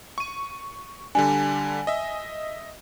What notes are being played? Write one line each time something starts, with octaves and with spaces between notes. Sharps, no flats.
C#6 D#7
D3 G3 D4 G#5
D#5 E5